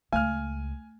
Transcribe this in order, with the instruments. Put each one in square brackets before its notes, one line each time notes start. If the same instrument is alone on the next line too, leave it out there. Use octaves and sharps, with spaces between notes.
[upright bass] C#2 [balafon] A3 [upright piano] G#5 F6